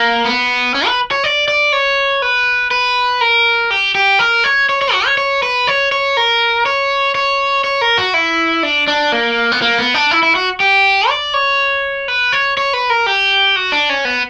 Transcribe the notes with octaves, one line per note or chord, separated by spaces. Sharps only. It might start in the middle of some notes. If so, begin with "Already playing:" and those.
Already playing: A#3
B3
C#4
B4
C#5
D5
D5
C#5
B4
B4
A#4
G4
G4
A#4
C#5
C#5
C#5
F#4
C#5
C#5
B4
C#5
C#5
A#4
C#5
C#5
C#5
A#4
F#4
E4
D4
D4
A#3
B3
A#3
B3
D4
E4
E4
F#4
G4
D5
C#5
B4
C#5
C#5
B4
A#4
G4
F#4
D4
C#4
B3